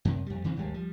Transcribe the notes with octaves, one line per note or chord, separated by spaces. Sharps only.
F#2 C3
F2 G3
F2 C#3 E3 C4
G#1 D#2 G3 G#3
F3 G3